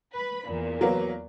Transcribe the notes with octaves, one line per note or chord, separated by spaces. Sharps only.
B4 B5
E2 A#2
F#3 A#3 B3